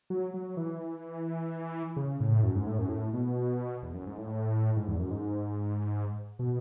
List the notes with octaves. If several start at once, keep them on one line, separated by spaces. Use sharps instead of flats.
F#3
F#3
E3
C#3
A2
F#2
G#2
A2
F#2
A2
B2
E2
F#2
G#2
A2
G#2
E2
F#2
G#2
B2